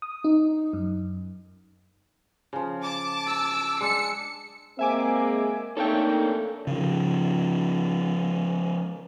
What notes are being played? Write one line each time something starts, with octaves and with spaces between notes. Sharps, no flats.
D#6
D#4
F#2
C#3 F3
A5 D6
E6
G#3 D4 C#7
G#3 A#3 C4 E5 G#5 D6
A3 A#3 C4 D4 D#4 A4 C#5 G5
C#3 F3